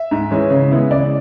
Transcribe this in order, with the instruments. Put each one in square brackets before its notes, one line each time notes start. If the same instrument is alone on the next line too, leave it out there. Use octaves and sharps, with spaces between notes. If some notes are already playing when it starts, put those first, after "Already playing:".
Already playing: [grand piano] E5
G#2
E3 G#3 C#4
C#3
G#3 B3 E4
C#3 D5